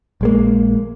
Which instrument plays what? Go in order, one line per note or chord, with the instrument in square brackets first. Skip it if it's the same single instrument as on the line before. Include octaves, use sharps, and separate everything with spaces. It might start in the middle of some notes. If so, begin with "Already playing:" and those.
[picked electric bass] A#1 G#3 A#3